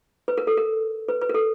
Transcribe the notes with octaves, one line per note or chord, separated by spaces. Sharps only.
B4
A#4
A4
A#4
B4
B4
A#4
A4